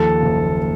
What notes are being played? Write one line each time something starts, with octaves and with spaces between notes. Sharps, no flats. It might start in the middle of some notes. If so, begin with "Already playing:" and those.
Already playing: D#2 F3 A4
F#1